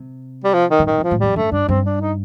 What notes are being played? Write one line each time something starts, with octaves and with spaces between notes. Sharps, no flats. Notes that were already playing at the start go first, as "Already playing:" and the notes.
Already playing: C3
G3
F3
D#3
C3
A#2 D#3
C3 F3
A2
F2 G3
G2 A3
G2 D4
G2 C4
D4
D#4